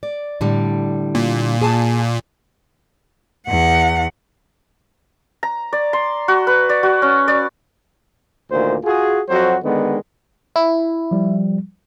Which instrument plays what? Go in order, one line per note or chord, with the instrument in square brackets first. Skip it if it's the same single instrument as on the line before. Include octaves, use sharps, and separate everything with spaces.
[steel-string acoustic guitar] D5
A2 D3 G3
[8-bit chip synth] A#2
[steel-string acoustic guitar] G#4 G#5 A5
[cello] E2 F#5
[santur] A#5
D5
C6
F#4
B4
D5
F#4
C#4
D5
[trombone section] D2 A#2 D#3 C5
F4 F#4 G#4
F2 F#3 F#4 C5
D3 D#3 G#3 B3
[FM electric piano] E4
[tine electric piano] F3 G3